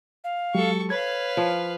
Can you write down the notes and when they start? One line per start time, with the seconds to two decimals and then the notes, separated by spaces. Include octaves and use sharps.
0.24 F5
0.55 F#3 G#3 G4 A4 C#6
0.90 B4 C#5 F5 G#6
1.37 F3